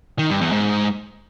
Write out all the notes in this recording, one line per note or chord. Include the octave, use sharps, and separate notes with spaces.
D#3
G2
E2
G#2